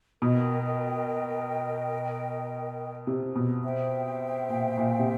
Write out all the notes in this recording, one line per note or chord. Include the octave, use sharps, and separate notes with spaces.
B2 A#4 D#5 G5
C3
B2
C5 E5 G5
A#2
A#2
C3